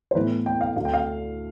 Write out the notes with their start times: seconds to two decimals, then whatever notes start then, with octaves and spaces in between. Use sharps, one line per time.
0.11 C5
0.15 A2 E3 B3 E4 B4
0.46 G5
0.61 F5
0.76 D2 D3 A3 F5
0.85 G5
0.93 F5